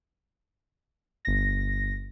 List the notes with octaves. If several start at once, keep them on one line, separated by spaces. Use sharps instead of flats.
G1 A#6